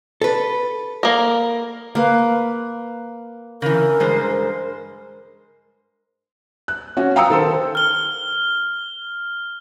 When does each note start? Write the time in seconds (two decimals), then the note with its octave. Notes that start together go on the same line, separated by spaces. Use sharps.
0.22 A4 B4
1.03 A#3 A#4
1.95 A#3 B4 F5
3.62 C#3 E3 A#4
4.00 G2 G#3 C5
6.68 F#6
6.97 C#4 F#4
7.16 F5 G5 A#5 D#6 E6 C#7
7.30 D#3 A4 C5
7.75 F6 G7